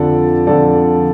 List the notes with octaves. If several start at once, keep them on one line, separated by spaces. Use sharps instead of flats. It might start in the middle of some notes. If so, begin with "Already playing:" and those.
Already playing: F2 D3 F3 A4 D5
F2 D3 F3 A4 D5